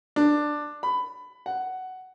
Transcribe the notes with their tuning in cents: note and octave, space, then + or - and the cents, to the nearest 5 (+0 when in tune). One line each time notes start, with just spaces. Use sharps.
D4 +10
B5 +15
F#5 +10